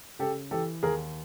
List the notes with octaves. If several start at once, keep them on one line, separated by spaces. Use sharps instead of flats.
C#3 G4 A4
E3 G4 A4
D#2 G#4 A#4